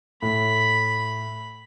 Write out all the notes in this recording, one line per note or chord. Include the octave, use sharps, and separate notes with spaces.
A2 B5